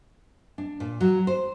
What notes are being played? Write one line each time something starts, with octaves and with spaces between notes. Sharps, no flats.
D4
A#2
F#3
C5